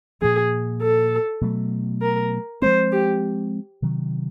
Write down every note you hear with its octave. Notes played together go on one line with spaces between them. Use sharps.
A#2 F3 A#3 G#4
A4
B2 F#3 A3
A#4
F3 G#3 C4 C5
G4
C3 D#3 F#3